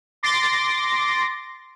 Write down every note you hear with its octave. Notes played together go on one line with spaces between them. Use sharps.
C6 D6 A6 A#6